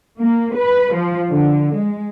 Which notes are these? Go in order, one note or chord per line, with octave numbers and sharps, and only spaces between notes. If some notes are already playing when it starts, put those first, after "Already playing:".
A#3
B4
F3
D3
G#3